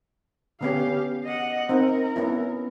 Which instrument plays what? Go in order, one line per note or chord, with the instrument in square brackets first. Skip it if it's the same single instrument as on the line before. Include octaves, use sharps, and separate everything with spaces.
[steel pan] D3 B3 C#4 [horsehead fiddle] G4 F5
[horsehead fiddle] D#5 F#5
[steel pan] C4 D#4 [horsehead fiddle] A#4
[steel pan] B3 C#4 E4